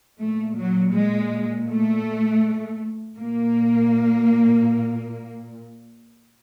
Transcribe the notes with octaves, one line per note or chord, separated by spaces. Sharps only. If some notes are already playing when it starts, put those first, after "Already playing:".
A#2 A3
F#3
G#3
A3
A#2 A#3